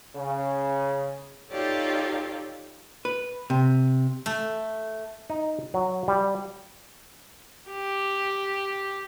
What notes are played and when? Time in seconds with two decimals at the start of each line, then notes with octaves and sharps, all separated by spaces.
0.16 C#3
1.51 D#4 F4 G4 A4 C#5 D5
3.05 B4
3.50 C3
4.26 A3
5.30 D#4
5.74 F#3
6.08 G3
7.71 G4